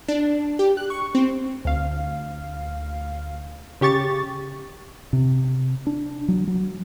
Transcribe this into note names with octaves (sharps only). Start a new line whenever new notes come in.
D4
G4
F#6
C#6
C4
D2 F5
C#3 G4 C#6 A6
C3
D4
F#3
F#3